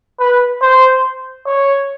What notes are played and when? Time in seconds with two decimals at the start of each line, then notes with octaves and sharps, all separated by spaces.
0.20 B4
0.62 C5
1.47 C#5